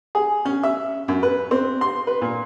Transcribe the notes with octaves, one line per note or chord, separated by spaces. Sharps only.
G#4
C#4
E5
F#2
B4
C4
C6
B4
A#2